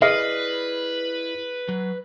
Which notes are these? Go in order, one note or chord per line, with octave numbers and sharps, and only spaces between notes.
E4 G#4 B4 D5 D#5 F6 C7
F#3